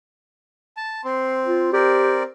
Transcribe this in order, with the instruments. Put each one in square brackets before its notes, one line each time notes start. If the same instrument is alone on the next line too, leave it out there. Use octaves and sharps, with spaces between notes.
[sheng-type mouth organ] A5
[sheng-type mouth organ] C4 [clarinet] C6
[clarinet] F4
[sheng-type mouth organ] C4 A#4 D5 [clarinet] G4